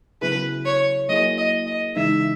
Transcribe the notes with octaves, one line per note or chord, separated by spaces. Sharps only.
C#3 F#3 B3 E4 G#4 B4
C#5
F#3 A#3 E4 G#4 D#5
D#5
D#5
C#3 E3 G#3 D#4 E5